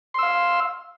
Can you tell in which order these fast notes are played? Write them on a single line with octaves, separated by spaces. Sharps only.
C6 E6 F5